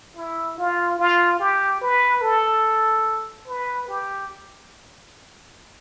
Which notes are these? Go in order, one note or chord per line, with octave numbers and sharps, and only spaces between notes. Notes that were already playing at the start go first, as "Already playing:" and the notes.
E4
F4
F4
G4
B4
A4
B4
G4